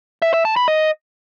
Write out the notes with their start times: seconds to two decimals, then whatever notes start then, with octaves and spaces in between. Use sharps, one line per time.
0.22 E5
0.34 E5
0.45 A5
0.56 B5
0.68 D#5